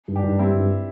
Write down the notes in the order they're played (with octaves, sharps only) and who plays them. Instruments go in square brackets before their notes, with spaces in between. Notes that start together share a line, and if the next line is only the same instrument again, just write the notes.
[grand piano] G2
[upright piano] D4 G4
[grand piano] G2
[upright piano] D4
[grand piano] G3 [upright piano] C4 E4
[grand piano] G2